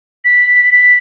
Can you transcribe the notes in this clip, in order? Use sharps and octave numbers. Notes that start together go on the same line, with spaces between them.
B6
B6